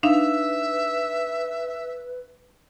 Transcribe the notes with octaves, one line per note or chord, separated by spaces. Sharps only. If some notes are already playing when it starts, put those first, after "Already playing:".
D4 D#4 B4 E5 F5